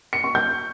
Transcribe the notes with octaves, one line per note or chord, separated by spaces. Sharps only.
C#7
C#6
G6